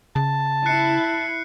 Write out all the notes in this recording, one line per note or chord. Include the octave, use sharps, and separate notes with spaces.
C#3 A5
E4 F#6 C7 C#7